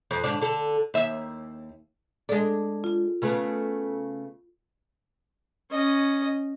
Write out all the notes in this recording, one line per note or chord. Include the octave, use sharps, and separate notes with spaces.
F2
G#2 D3 D4
D3 A4
D#2 E5
G#3 D4 A4
F4
C#3 A3 B3
C#4 D#5